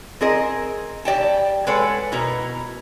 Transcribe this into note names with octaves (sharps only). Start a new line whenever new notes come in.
C4 G#4 A#4 D#5
G3 D5 G5 A5
G#3 A4 B4 C#5 F#5
B2 E4 A#4 A#5